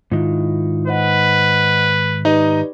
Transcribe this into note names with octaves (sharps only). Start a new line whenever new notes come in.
G#2 D#3 E4 F4
B4 C5 D#5 F#5
D#4 G4 B4 D5 D#5